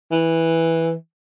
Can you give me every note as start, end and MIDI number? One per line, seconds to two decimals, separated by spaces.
0.11 0.94 52